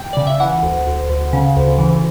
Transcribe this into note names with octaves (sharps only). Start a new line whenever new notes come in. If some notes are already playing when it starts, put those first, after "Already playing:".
Already playing: G5
C#3 D5
E5
E3 F#5
D2
D2
D2
C#3
D2
E3